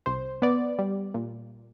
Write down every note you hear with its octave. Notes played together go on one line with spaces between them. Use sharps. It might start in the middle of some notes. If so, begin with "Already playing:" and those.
C2 C5
B3 D5
G3
A#2